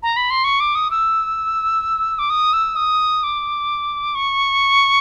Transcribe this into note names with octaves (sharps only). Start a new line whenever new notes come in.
A#5
B5
C6
C#6
D6
D#6
E6
D6
D#6
E6
D#6
D6
C#6